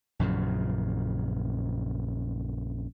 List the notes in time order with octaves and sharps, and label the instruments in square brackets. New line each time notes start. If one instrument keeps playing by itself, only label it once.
[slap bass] A#1 F#2 A#2 C#3